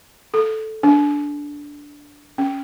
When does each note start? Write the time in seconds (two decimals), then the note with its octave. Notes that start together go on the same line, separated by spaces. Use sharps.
0.34 A4
0.83 D4
2.38 C#4